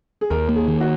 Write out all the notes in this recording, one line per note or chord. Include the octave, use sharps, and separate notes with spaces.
G#4
D#2 A#4
A#3
G#4
D#3
F#4